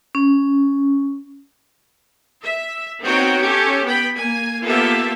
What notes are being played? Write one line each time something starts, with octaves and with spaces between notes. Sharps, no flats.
C#4
E5
B3 C4 D#4 F#4 C#5 G5
C#4 G4 A4
B3 G5 B5
A#3 G#5
A#3 B3 F4 G4 A4 E5